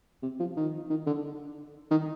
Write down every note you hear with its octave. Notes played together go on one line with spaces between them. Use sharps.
C3
F3
D#3
D#3
D3
D#3